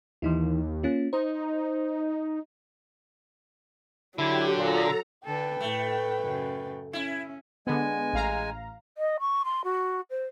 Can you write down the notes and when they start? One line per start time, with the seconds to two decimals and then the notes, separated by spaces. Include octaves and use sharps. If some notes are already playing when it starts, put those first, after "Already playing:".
0.22 D#2 E3 D#4 E4
0.83 A#3 C#4 F4
1.13 D#4 C5
4.18 D3 F#3 E4 G4
4.57 A#2 A4 A#5
5.25 D3 A4 B4 G5
5.61 A2 A3
6.21 F#2 C#3
6.93 C#4 E4
7.67 D3 G#3 B3 G#5
8.13 A1 F5 A#5
8.98 D#5
9.20 C#6
9.45 C6
9.64 F#4
10.10 C5